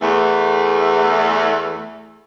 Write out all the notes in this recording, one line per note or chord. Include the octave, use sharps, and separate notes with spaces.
E2 A3